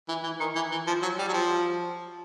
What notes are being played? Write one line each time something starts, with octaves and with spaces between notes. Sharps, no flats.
E3
E3
D#3
E3
E3
F3
F#3
G3
F#3
F3